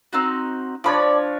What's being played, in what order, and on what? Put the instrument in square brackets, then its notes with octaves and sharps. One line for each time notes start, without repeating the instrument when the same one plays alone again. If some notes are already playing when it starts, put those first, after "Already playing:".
[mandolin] C4 D#4 F#4
[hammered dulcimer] F3 D4 C#5 [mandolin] D5 B5